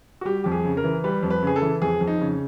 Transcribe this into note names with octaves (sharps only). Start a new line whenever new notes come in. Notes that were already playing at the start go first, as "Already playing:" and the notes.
F#4
G3 G4
F2 G4
G#4
C#3
A#4
E3
G3 B4
F2
B4
C#3 G#4
A4
E3
F2 G#4
F2
D#4
C#3